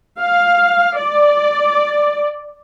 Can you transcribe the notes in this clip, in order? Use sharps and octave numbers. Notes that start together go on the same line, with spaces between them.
F5
D5